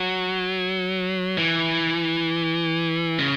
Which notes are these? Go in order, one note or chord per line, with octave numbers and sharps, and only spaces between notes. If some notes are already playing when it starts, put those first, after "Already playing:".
Already playing: F#3
E3
C#3